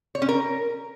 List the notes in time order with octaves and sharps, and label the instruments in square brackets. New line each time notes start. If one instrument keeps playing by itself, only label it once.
[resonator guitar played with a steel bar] C#5
C#4
A#4